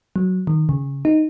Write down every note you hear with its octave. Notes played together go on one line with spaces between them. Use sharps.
F#3
D#3
C#3
D#4